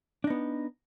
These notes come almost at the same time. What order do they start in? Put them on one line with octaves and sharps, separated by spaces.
D4 D#4 B3